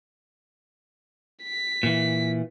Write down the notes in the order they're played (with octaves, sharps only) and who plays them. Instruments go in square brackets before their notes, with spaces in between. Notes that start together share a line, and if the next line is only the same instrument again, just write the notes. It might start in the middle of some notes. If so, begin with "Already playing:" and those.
[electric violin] B6
[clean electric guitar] A#2 E3